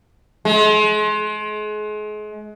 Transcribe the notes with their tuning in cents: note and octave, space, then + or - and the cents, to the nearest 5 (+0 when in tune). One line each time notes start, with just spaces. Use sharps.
G#3 +35